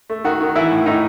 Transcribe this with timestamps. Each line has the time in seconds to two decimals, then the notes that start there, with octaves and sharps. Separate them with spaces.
0.10 A3
0.24 D#3 F#4
0.41 D#3
0.56 E3 E4
0.71 A2
0.86 A2 D#4